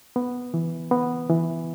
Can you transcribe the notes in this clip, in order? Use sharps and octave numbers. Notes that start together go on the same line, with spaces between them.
B3
E3
B3
E3